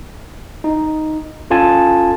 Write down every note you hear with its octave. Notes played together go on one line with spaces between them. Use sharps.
D#4
C#4 F4 A4 G#5 A5